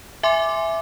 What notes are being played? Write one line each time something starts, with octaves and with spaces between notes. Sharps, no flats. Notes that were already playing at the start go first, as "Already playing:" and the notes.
E5 G#5 C6 D6